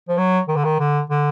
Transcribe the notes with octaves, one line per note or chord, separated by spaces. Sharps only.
F3
F#3
D#3
D3
D#3
D3
D3